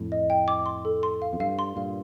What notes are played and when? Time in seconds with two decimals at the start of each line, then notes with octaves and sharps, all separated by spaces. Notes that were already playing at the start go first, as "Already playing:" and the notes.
Already playing: F2 A2
0.12 D#5
0.30 G5
0.48 D6
0.66 C6
0.85 A4
1.03 C6
1.22 F5
1.33 F2
1.40 G2 F5
1.59 C6
1.76 G2 A#2 F5